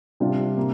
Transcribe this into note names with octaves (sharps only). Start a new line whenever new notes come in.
C3 G3 D4 F4
C3 A#3